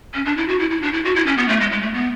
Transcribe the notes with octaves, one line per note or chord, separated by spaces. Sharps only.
C#4
D4
E4
F#4
E4
E4
D4
E4
F#4
E4
C#4
B3
A3
G#3
G#3
A3
B3